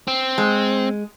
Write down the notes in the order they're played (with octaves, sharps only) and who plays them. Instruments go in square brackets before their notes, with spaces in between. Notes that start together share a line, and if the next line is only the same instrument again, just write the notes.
[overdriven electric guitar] C4
[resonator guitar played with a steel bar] G#3